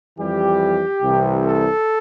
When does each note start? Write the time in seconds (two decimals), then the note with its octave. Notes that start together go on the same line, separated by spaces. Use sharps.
0.18 F2 E3 G3 G4
1.02 C2 C3 E3
1.44 A4